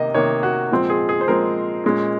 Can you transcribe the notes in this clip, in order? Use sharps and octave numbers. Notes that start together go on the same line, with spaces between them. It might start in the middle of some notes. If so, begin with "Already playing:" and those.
Already playing: C3 D#3 A#3 D#4 D#5
C3 D#3 A#3 D#4 C#5
F#4
A#2 F3 G#3 C4
G#4
G#4
C5
A#2 F3 G#3 C4 A#4
A#2 G#3 C#4